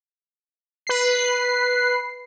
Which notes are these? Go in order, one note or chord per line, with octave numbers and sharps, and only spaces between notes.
B4 C7